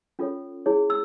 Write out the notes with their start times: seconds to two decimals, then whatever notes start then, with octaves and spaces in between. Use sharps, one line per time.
0.19 C#4 F4 A4 C#5
0.66 E4 G#4 C#5
0.90 E6